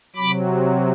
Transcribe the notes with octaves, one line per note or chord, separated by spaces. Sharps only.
C3 F#3 B5 D6